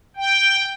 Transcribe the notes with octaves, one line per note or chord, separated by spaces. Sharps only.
G5